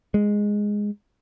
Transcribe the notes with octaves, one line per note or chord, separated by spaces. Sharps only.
G#3